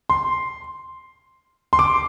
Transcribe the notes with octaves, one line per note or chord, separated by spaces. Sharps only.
C6
C6
D6